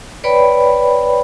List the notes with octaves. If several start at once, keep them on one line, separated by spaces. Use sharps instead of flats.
B4 C#5 D5 G5 B5